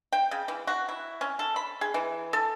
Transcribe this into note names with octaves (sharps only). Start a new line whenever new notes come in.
G5
C#3
E3
F#4
E4
C#4
A4
B5
G#4
E3
A4